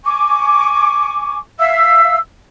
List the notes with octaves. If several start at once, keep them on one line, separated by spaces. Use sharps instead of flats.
G#5 C#6 D6
E5 F5 E6